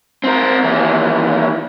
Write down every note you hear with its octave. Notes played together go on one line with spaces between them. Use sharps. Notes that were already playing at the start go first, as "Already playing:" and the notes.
C4 A#4
D#2 E3